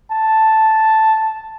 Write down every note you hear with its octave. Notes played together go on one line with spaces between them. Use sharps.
A5